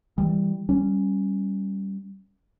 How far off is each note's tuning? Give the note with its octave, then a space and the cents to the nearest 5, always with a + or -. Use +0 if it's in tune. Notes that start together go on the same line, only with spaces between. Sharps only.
E3 -15 G3 +0
G3 -5 C#4 -5